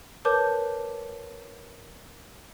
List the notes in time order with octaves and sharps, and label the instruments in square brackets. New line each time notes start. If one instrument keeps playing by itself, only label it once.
[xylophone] A#4 B4 C#5 A5 D6 G6